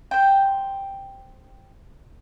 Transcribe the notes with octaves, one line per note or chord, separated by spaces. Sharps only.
C5 G5